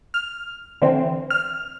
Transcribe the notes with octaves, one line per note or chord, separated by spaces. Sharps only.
F6
D3 E3 C4
F6